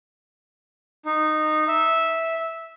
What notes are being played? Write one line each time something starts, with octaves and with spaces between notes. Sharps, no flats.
D#4
E5